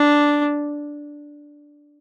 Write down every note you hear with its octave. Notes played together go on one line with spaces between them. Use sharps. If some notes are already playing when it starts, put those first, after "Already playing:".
Already playing: D4